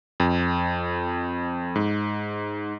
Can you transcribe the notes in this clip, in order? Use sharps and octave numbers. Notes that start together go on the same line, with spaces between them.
F2
G#2